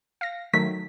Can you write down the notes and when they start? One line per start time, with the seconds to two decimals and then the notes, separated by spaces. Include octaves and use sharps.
0.21 F5 A#6
0.53 D#3 F#3 A3 B6